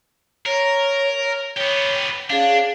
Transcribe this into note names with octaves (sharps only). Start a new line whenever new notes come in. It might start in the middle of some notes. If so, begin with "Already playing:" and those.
A#4 C#5
B3 G4 C#5
C#4 D4 G#4 F5